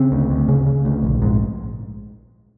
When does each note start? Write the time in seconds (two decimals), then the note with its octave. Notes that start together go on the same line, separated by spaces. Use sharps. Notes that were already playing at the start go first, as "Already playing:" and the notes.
Already playing: C#3 C4
0.12 D2
0.30 D2
0.48 C#3
0.67 C#3
0.85 D2
1.04 A#1
1.22 G#2